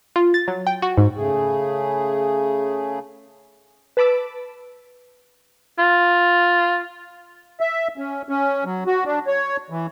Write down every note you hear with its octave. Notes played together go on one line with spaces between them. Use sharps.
F4
A6
F#3
G5
F#4
G#2
C#3 A3 G#4
B4 A5 B5 D6 E6
F4
E5
C#4
C#4
F#3
F#4
D4
C#5
E3